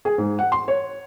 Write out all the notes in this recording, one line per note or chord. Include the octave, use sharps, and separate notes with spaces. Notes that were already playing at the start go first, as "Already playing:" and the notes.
G#4
G#2
F#5
C6
C#5